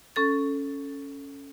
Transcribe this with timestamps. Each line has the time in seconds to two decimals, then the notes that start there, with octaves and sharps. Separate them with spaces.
0.16 C#4 A4 A6